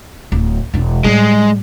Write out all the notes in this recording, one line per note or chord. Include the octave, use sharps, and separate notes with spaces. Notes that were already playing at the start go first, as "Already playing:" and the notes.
D1
E1 D4
A2 G3 G#3